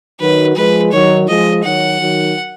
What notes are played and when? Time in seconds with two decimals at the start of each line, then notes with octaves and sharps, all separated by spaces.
0.20 D#3 F#3 B4
0.56 F3 G#3 B4
0.92 D#3 F#3 C#5
1.28 F3 G#3 D#5
1.64 D#3 F#3 F#5
2.00 D#3 F#3